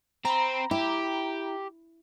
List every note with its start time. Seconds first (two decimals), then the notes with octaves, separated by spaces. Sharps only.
0.25 C4 A#5 B5
0.71 E4 G4